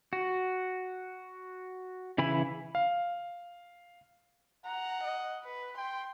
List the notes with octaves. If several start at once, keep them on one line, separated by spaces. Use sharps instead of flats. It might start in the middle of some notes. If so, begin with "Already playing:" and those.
F#4
C#3 E3 E4 G#5 B5
F5
F#5 A#5
D#5
B4
G5 C6